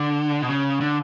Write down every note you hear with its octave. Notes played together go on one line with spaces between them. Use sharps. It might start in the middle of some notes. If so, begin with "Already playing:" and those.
Already playing: D3
B2
C#3
D3